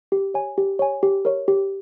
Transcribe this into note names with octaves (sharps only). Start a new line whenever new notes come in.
G4
C#5 G#5
G4
C#5 G#5
G4
A#4 C#5
G4